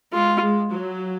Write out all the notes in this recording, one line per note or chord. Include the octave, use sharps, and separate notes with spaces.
G#3 F4
G#3
F#3